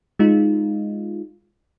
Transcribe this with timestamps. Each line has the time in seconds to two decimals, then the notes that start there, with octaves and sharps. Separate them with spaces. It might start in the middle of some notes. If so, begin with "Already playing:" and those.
0.19 G#3 D#4 F4